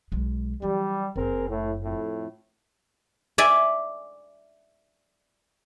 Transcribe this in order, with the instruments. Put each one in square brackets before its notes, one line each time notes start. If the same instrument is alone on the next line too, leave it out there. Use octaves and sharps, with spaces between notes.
[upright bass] B1 G#3
[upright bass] E3 F#3 [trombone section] G3
[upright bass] F#1 F#2 [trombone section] C4 G#4 A#4
[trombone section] A2
F2 A2
[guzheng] D5 E5 G#5